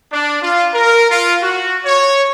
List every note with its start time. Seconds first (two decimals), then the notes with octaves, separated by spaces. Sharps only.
0.12 D4
0.42 F4
0.74 A#4
1.10 F4
1.42 F#4
1.85 C#5